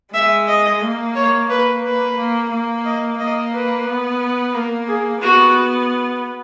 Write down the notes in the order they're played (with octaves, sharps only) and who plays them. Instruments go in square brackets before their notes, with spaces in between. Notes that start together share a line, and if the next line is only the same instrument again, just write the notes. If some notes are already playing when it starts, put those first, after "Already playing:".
[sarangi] G#3 [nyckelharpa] E5
[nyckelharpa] D#5
[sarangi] A#3
[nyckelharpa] C#5
[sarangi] A#3 [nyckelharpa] B4
[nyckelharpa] B4
[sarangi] A#3
A#3
[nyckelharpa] D#5
[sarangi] A#3 [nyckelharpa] D#5
[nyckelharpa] B4
[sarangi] B3
[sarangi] A#3 [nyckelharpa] A#4
[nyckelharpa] G#4
[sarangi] B3 [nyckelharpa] F#4